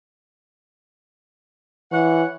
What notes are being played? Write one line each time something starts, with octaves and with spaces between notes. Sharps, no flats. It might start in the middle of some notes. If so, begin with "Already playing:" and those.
E3 C#5 F#5